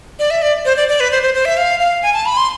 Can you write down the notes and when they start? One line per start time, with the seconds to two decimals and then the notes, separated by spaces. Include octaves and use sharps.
0.19 D5
0.30 E5
0.42 D5
0.65 C5
0.77 D5
0.89 D5
1.00 B4
1.11 C5
1.23 C5
1.34 C5
1.45 E5
1.57 F5
1.80 F5
2.02 G#5
2.14 A5
2.26 B5
2.37 C6